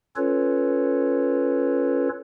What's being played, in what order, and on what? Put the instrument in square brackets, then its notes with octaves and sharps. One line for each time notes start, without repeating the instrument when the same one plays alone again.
[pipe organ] C#4 F4 A4 B4 C#5